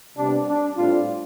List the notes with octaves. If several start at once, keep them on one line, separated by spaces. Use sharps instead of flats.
C3 G3 B3 D4
D4
A2 G3 C4 D4 F4